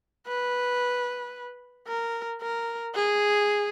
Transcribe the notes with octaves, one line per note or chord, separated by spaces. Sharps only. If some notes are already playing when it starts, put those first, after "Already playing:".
B4
A#4
A#4
G#4